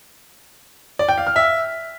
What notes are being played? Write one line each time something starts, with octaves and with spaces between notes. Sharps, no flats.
D5
G5
F5
F6
E5